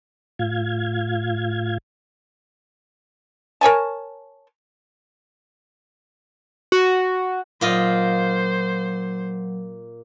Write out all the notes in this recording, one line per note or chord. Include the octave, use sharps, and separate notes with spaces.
A2 F4 F5 G#6
A#4 C#5 G#5 A5
F#4
A#2 F#3 F4 C5 D#5